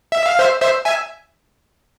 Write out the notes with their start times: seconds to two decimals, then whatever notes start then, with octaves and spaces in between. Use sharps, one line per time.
0.12 E5
0.26 F5
0.39 C5 E5
0.61 C5 E5
0.85 E5 G#5